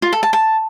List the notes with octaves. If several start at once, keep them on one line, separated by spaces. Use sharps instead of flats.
F4
A4
A5
A5